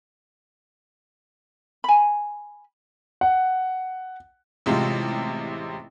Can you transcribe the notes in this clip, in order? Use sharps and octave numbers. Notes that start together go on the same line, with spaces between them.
G#5 B5
F#5
A1 C3 G#3 C4 F4 G4